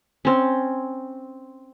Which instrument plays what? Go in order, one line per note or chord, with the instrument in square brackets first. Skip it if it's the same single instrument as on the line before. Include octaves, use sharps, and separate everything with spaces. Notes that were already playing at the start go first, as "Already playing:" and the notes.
[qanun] C4 C#4